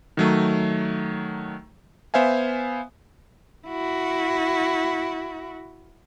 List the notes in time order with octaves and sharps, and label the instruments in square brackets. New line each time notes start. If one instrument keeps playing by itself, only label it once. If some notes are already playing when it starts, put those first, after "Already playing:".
[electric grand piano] D#3 F#3 A3
B3 C5 E5 F5 G#5
[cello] E4 F#4